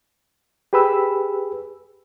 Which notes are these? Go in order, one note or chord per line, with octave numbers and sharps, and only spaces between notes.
G4 G#4 B4 B5 E6